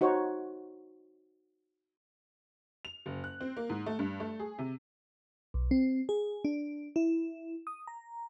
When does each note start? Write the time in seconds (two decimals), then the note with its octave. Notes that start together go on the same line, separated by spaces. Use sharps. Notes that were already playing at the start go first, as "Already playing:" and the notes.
0.01 D#4 F#4 C5 C#5
2.85 F7
3.06 F#1
3.24 F#6
3.41 C4
3.57 A#3
3.69 G#2
3.86 A3
3.99 G2
4.20 A3
4.40 G#4
4.59 C3
5.54 B1
5.71 C4
6.09 G#4
6.45 D4
6.96 E4
7.67 D#6
7.87 A#5